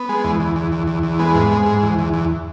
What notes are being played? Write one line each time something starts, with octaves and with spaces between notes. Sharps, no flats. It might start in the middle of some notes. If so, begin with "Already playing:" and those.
Already playing: B3
G#3
E2
E2
E2
E2
E2
E2
G#3 B3
G#2
G#3
G#2
E2
E2
E2